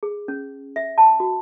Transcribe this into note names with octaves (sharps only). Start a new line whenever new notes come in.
G#4
C#4
E5
A5
F#4